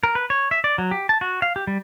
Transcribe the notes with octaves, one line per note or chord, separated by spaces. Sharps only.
A#4
B4
C#5
E5
D5
F#3
G4
A5
F#4
F5
G4
G3